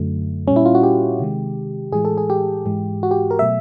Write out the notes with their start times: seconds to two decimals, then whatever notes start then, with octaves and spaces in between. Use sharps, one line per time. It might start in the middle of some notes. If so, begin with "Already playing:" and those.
Already playing: F#2 D3 F#3 A3
0.47 A#2 G3 C#4
0.56 E4
0.66 F4
0.75 F#4
0.83 G4
1.19 C3 D#3 G#3
1.92 A2 E3 G#3 G#4
2.05 A4
2.18 G#4
2.30 G4
2.66 G#2 E3 G#3
3.03 F#4
3.11 G4
3.31 A#4
3.39 B2 F#3 A3 E5